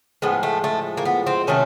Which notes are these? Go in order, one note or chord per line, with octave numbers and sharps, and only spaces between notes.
A2 F3 G#3 B3
A3
A3
A#3
B3
C4
C3 D#3 F#3 A3 C#4